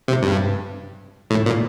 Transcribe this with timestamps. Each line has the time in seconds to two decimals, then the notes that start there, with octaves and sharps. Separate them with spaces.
0.08 C3
0.23 G2
1.30 A2
1.46 A#2